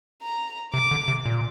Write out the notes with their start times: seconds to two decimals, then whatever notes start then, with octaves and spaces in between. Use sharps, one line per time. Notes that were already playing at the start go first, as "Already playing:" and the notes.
0.22 A#5
0.74 C3 D6
0.91 D3
1.08 C3
1.26 A#2